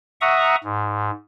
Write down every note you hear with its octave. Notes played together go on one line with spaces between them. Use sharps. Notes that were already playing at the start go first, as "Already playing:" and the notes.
E5 F#5 A#5 C#6 D#6
G#2